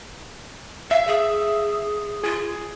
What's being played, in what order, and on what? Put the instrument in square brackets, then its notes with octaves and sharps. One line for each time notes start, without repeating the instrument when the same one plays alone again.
[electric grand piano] E5 [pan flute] F5
[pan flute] G#4
[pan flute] F4 [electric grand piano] G#4